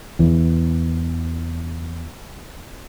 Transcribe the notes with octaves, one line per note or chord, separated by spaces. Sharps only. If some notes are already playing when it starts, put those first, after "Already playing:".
E2 E3